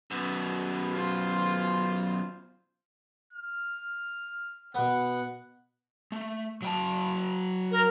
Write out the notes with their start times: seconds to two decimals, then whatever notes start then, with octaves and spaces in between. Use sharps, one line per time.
0.11 F#2 B2
0.93 F4 C5
3.33 F6
4.75 B2 B3 F#5
6.12 A3
6.62 F#3 G5 A5
7.72 A#4